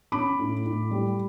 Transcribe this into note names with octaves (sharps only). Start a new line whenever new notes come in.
C#4 B5 D6
A2
A2
G3